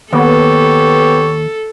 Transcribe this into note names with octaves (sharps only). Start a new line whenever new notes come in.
D#2 B3 G4 A4 C#5